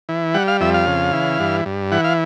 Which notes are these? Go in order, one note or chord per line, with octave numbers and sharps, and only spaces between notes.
E3
G3 F#5
F5
F2 E5
F5
C#3
E3
G2
G2
E3 F#5
F5